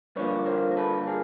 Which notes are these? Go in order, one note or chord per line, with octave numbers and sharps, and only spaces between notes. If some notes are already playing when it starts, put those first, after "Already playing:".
G2 D3 F3 A#3 B4 C#5
A#4 C5
A#4
A4 B4
G#4 A#4